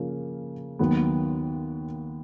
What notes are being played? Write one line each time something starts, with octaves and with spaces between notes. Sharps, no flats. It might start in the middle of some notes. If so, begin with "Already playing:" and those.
Already playing: C#3 F3 A#3 C#4
D#2 D#3 F#3 B3